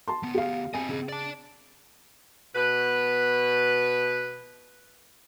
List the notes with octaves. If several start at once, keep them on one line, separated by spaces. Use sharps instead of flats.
A5 C6
D2 B3
G4 F5
C4 D#5 G#5
C#3
D5 A5
B2 B4